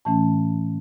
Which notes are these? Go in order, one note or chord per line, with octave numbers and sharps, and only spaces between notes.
A2 E3 A3 C#4 A5